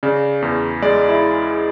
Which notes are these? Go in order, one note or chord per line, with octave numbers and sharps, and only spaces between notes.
C#3 D5
E2
G#3 D5
E4